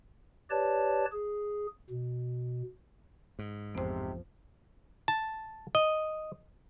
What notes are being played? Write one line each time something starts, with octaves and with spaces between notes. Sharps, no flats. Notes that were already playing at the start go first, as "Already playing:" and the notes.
G4 B4 C#5 D5 A5
G#4
B2
G#2
A1 F2 C3 F3 B3 C5
A5
D#5